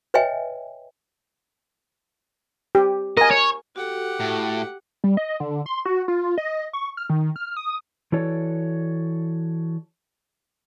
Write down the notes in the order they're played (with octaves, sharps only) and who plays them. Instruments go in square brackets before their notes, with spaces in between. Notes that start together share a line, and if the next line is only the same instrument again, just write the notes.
[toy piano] B4 C#5 D#5 E5 G5 G#5
[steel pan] G4
[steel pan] A#4 G#5 [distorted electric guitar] D#5
[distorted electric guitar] C#5
[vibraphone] F#4 A4 [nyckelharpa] G4 F#5
[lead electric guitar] A2
[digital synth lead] G3
D#5
D3
C6
F#4
F4
D#5
C#6
F6
D#3
F6
D#6
[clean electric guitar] E3 E4 F#4 A4 C#5 D5